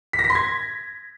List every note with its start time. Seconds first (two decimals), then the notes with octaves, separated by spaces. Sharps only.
0.13 B6
0.19 A#6
0.24 B6
0.30 C6
0.35 G#6